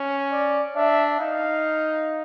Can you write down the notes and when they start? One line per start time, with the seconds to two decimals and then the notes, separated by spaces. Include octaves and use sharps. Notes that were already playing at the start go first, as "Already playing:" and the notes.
Already playing: C#4
0.32 D5
0.76 D4 E5
1.19 D#4 F5